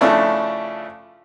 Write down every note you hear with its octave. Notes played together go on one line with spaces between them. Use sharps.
C#3 F3 A3 D4 E4